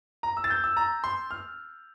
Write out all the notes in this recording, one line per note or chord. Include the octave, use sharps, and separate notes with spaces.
A#5
E6
A6
G6
E6
A#5
C6
F6